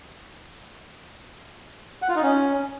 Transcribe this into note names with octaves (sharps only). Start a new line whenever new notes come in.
F#5
F4
D#4
C#4